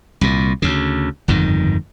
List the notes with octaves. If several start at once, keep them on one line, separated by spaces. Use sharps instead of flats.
C2 A#2
D2 C#3
G1 F2 G#2 D#3